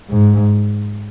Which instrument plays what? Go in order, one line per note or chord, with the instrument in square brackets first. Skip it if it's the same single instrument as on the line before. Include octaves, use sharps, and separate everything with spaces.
[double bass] G#2